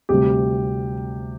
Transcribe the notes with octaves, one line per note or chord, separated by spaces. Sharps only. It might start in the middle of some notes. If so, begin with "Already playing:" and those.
D2 C3 G3 G4